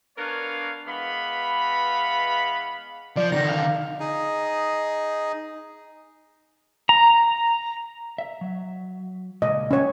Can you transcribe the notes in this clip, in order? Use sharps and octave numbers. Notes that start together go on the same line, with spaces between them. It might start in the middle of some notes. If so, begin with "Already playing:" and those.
B3 D4 A#4 B4 C#5 F5
E3 G#3 B3 F5 B5
F3 D5
D3 D#3 A#6
F5
D#4 G#4
A#5
E5
F#3
A#2 C#3 G#3 D#5
C#4 C#5